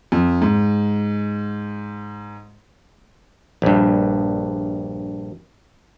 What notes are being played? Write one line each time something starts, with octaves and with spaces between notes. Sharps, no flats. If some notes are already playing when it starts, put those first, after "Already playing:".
F2
G#2
A#1 G2